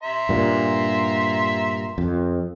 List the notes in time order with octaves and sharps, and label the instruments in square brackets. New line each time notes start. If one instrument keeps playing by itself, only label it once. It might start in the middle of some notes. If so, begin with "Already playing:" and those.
[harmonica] E5 A#5 C6
[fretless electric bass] G2 A#2
F2